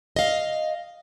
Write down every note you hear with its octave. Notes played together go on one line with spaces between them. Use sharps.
D#5 F5